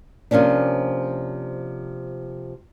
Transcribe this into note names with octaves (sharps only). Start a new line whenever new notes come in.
C3 F3 A#3 C#4 D4